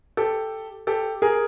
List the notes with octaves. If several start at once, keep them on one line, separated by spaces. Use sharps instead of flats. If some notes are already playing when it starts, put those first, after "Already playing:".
G4 A4
G4 A4
G#4 A#4